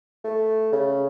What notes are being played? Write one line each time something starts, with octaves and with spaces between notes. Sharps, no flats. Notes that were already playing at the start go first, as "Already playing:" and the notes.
A3
C#3